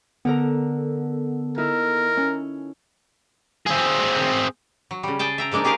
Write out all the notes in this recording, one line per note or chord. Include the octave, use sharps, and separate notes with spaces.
D3 B3 A4 A#4 A#5
D#4 E4 A#4
C#4
C4 G#4
F#3
C#3 G3
G#4 G5 A5
E5 G5 A#5
F3 G#3 A#3 D4 D#4
C#4 G4 G#4 A#4 F5